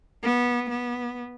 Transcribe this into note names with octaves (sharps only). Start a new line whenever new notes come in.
B3
B3